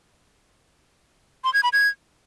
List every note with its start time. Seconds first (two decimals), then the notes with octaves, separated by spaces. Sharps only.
1.44 C6
1.54 G#6
1.63 B5
1.73 G#6